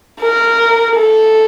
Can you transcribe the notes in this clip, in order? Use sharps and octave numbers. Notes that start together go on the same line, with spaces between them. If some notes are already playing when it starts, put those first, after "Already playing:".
A#4
A4